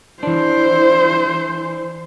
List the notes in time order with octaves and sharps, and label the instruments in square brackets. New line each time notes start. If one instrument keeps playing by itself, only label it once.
[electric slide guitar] E3 D4 [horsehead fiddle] E4 C5